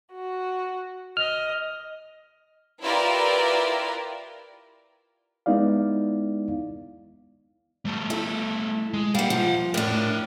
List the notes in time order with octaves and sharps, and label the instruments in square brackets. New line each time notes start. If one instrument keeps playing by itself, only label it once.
[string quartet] F#4
[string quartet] D#5 [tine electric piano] F6
[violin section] E4 F4 G4 A#4 B4 D5
[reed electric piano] G#3 B3 D#4 E4 D5 F5
[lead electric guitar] G3 A3
[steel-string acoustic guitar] E4 A4
[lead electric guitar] G#3
[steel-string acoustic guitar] G3 A#3 [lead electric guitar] F5 F#5
[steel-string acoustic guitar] F3
[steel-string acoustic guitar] A2 D4 [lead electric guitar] A#4 C#5